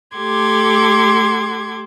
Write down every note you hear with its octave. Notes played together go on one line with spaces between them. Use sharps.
A3 G4 A4 C6 D6 G#6